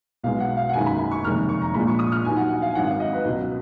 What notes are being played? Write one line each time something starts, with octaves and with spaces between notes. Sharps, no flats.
B1 B2 G#3 F5
F#5
F5
F#5
F#1 F#2 D#3 G#3 G#5
B5
B5
C#6
F1 D#2 D#3 G#3 F6
C#6
A#5
A#1 A#2 G#3 B5
C#6
D#6
F6
D#2 D#3 F#3 G#5
F#5
F#5
F5
G#5
G#1 G#2 F#3 F#5
F5
D#5
B4
C#2 B2 F#3